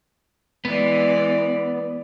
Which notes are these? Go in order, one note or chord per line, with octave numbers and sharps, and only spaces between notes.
E3 G#3 B3 D5